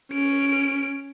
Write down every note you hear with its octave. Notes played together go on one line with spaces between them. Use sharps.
C#4 D7